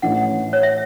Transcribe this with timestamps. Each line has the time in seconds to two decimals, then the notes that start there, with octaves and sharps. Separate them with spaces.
0.02 A1 A2 E3 C#4 F#5
0.53 C#5
0.63 E5